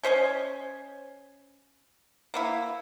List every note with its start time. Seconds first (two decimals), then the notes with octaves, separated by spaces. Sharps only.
0.03 C#4 C5 D#5 G#5
2.34 A#3 B3 E4